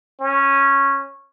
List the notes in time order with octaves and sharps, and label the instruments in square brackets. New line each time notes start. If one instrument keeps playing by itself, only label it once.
[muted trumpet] C#4